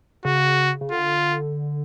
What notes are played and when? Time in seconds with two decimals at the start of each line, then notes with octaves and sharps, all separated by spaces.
0.25 C#3 F#4
0.81 C#3
0.91 D3 F4